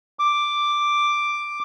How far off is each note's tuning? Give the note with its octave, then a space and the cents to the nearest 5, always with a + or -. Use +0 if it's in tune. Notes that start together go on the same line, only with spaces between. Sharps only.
D6 +5